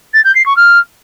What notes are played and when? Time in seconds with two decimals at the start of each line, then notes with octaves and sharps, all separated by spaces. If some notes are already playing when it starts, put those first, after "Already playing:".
0.14 A6
0.24 G6
0.35 C7
0.46 C#6
0.57 F6